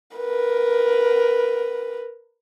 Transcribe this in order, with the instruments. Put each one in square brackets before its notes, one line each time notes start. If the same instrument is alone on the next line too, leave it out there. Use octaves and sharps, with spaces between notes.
[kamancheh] A#4 B4